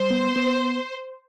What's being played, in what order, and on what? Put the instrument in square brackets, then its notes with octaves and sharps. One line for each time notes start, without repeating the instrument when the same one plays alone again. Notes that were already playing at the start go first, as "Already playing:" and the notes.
Already playing: [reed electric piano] G3 [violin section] C5
[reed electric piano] B3
B3